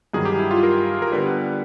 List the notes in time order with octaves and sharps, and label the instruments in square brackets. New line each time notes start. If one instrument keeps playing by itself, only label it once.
[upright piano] G2 D#3 F#3 [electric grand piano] G#4
[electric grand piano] G4
E4
F4
A#4
A#4
[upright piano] D3 G3 B3 [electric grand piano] B4